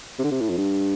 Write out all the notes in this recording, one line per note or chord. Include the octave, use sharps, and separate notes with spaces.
C3
D3
C3
A2
F2
G2